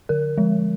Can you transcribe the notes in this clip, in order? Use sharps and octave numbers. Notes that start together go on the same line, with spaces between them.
D3 A#4
F3 G#3